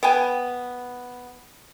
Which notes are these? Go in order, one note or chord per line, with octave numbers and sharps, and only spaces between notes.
B3 G5 G#5